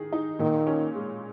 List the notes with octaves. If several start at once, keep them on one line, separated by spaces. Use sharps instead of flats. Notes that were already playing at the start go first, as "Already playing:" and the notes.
Already playing: D#3 G#4
D#4
A#2 D#3
C#4
G#3